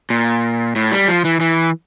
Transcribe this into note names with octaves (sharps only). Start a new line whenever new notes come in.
A#2
A2
G3
F3
E3
E3